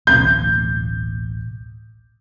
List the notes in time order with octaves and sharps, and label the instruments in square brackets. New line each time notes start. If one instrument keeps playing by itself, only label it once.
[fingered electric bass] D1 A1 B2 [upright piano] G6